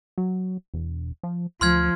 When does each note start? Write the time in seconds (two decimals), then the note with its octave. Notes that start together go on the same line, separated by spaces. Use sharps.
0.18 F#3
0.74 E1
1.23 F3
1.61 D2 F3 C6 F6 G#6